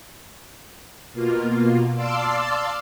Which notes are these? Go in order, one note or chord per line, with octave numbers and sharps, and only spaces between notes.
B2 A#3 F4
D5 F5 A5 C6 D6 E6